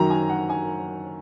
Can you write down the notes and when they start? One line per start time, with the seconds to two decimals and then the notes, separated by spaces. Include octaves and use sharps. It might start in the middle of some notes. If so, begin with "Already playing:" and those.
Already playing: F#2 D#3 F#3 A#5
0.10 G#5
0.30 F#5
0.49 G#5